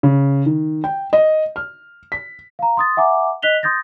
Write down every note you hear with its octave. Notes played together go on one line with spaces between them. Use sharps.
C#3
D#3
G5
D#5
F6
B6
F5 A#5
C6 D#6 A6
E5 F#5 G#5 A#5 D6
D#5 F#6 B6 F7 G7
C6 D#6 G6 A6 A#6